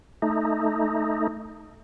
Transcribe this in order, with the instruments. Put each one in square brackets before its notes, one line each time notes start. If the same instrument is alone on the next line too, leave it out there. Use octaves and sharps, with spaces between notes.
[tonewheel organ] A3 D#4